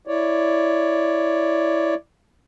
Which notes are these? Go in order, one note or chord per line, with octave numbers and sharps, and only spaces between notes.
E4 C#5 D5